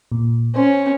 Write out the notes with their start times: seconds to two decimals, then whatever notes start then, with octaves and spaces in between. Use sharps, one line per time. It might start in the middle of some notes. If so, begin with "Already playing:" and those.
0.12 A#2
0.56 C#4 C5